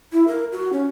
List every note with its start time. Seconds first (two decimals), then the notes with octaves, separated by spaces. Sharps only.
0.13 E4
0.28 A#4
0.52 F#4
0.73 C#4